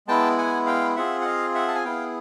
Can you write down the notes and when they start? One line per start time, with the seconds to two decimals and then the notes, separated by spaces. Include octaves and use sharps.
0.08 G#3 B3 E4 G5 A5
0.38 F#5 G#5
0.67 F5 G5
0.96 C4 F4 G#4 E5 F#5
1.21 F#5
1.25 D#5 F5
1.54 E5 F#5
1.68 A5
1.75 G#5
1.84 B3 E4 G#4 F5 G5